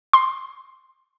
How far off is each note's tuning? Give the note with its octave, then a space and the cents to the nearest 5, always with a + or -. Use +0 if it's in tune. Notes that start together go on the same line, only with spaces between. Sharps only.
C6 +10